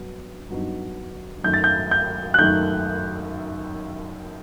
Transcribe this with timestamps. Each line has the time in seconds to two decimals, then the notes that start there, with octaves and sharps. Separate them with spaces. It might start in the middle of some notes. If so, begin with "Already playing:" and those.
Already playing: G2 F#3 B3
0.50 G2 F#3 B3 D#4
1.44 F#2 D#3 A3 D#4 G6
1.54 A6
1.64 G6
1.91 G6
2.34 F#6
2.39 F#2 D#3 A3 D#4 G6